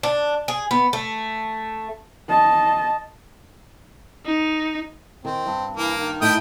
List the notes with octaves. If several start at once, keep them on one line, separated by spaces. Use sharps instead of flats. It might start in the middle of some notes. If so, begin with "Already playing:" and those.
D4
G#4
B3
A3
D#5 A5
D#4
D#3 C4
G2
E3 A#3
D#3
A2 D#4 E4 G5 D#6